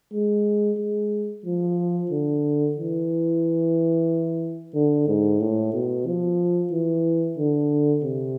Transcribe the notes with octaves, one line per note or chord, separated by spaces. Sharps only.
G#3
G#3
F3
D3
E3
D3
G#2
A2
B2
F3
E3
D3
C3